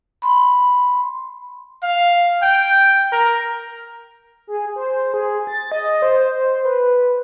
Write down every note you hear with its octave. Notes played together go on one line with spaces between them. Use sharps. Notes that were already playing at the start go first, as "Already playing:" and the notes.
B5 C6
F5
G5
A#4
G#4
C5
G#4
A6
D#5
C5
B4